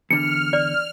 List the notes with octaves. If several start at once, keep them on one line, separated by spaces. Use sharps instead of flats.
E2 D3 F6 C#7
D5